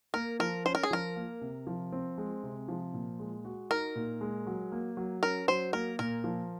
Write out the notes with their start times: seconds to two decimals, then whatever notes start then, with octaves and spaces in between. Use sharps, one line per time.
0.14 A#3 A#4
0.40 F3 A#4
0.65 C#4 C5
0.75 A#4
0.83 G#4
0.91 F3 A#4
1.16 A#3
1.42 C3
1.67 F3
1.92 C4
2.18 G#3
2.43 C3
2.68 F3
2.94 A#2
3.19 G#3
3.45 F#4
3.71 D#4 A#4
3.95 A#2
4.21 G#3
4.47 F#3
4.72 A#3
4.97 F#3
5.23 C#4 A#4
5.48 F#3 C5
5.73 A#3 A#4
5.99 A#2 A#4
6.24 F3